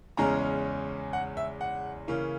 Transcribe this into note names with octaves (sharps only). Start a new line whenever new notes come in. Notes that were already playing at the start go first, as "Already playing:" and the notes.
E2 C#3 G#3 C#4 A#5
F#5
E5
F#5
C#3 E3 A#3 C#4